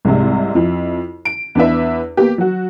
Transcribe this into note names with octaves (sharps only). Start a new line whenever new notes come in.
C2 G#2 C3
F2 E4
D7
E2 D4 B4 E5
A#3 B3 G4
F#3 F#4